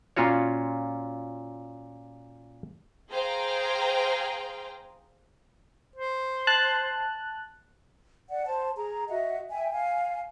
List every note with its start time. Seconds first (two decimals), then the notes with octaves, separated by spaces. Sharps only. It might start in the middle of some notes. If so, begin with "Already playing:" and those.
0.16 A#2 C#4 F4 F#4 C#5
3.12 G#4 C5 F5 G5 A#5
5.96 C5
6.47 A5 F#6
8.29 D5 F#5
8.46 C5 A5
8.76 G#4 A#5
9.08 F#4 D#5 E5 F#5
9.51 E5 G5 G#5
9.72 F5 G#5